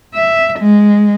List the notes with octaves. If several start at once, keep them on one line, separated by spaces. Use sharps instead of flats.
E5
G#3